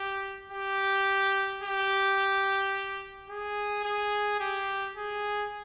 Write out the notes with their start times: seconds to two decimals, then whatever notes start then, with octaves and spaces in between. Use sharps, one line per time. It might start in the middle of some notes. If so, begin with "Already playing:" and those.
Already playing: G4
0.52 G4
1.63 G4
3.30 G#4
3.85 G#4
4.40 G4
4.96 G#4